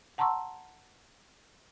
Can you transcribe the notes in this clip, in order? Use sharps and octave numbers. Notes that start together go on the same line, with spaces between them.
F#5 A5 A#5 C6 C#6 E6